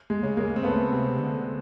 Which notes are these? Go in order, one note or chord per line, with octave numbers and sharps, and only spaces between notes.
G#3
C#3
G#3 A#3
C4
C#3 A3 B3
C3
D3